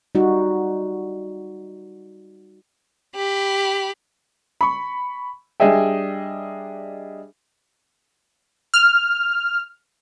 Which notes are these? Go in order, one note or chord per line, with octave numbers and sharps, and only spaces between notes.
G3 D#4 F#4
G4 B5
B5 C#6
G3 D4 G#4 D#5 E5 G5
F6